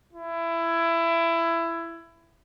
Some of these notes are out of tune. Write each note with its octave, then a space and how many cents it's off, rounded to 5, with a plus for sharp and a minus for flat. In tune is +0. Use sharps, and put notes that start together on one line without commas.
E4 +20